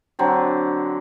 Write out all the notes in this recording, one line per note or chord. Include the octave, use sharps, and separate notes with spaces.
D3 F#3 C4